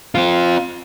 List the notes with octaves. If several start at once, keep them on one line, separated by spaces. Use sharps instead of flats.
C4 F4